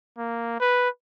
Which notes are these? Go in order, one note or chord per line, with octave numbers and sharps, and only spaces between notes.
A#3
B4